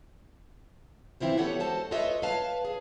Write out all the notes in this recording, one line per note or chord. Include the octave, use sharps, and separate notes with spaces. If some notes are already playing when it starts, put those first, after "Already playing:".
E3 C4 E4 F4 C5
B3 G4 A4 C#5 F#5
G#3 F#4 A4 C5 A5
F4 A4 B4 C#5 D#5 E5
B4 C#5 F5 A5
G#4